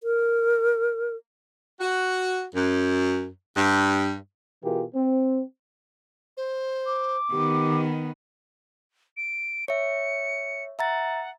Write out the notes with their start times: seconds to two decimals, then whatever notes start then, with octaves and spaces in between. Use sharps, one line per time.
0.03 A#4
1.80 F#4
2.54 F#2
3.56 G2
4.64 B2 E3 F4 G4 G#4 A#4
4.95 C4
6.37 C5
6.86 D6
7.32 D#3 B3 G4
9.17 D7
9.68 C#5 E5 C#7
10.79 E5 F#5 A#5 A6